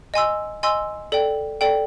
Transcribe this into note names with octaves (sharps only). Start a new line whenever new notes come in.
D#5 G#5 C6 E6
D#5 G#5 C6 E6
A4 D5 G5
A4 D5 G5